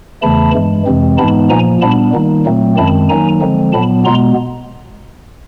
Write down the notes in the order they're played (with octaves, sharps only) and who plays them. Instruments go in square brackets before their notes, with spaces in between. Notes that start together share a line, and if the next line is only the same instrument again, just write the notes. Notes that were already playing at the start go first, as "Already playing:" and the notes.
[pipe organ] E2 C#3 E3 A3 A5 B5
G2 E3 G#3
F2 C3 E3 G#3 C4
G#2 E3 G#3 B3 D#4 A5 B5
A#2 F3 A#3 G#5 A#5
A#2 G3 B3 D4 A5 B5
D#3 G3 A#3 D#4
A#2 F#3 A3 C4
F#2 D#3 G#3 C4 A5 B5
D#3 F#3 A#3 D#4 G#5 A#5
D3 F3 G#3 C4
A#2 F#3 B3 A5 B5
B2 G#3 B3 A#5 C6